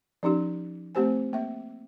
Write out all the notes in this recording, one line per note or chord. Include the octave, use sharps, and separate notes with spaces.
F3 C#4 D#4 G4
A3 C4 G4 C5 G#5
A#3 E5